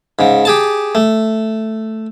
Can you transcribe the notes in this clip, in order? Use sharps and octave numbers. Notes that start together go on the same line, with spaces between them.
G#2 C#3
G4 G#4 A5
A3